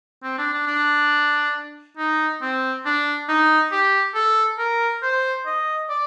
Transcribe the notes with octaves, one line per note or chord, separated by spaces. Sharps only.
C4
D4
D4
D4
D#4
C4
D4
D#4
G4
A4
A#4
C5
D#5
D5